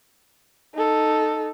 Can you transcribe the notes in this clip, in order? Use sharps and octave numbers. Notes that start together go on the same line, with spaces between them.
D#4 A4